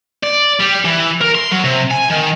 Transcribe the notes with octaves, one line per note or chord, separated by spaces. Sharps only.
D5
G3
E3
A#4
C6
F#3
C3
G#5
D#3